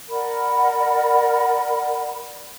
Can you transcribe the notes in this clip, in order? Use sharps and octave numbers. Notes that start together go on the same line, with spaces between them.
A#4 D5 F#5 B5